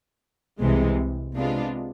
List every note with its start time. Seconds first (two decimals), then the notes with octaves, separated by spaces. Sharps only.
0.61 C2 C3 E3 G#3
1.35 C3 G#3 B3 D4 F4